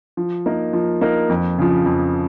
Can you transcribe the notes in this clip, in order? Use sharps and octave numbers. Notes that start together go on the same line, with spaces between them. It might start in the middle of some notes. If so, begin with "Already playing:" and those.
F3
A#3 D#4 A#4
F3
A#3 D#4 A#4
F2
C#3 F3
F2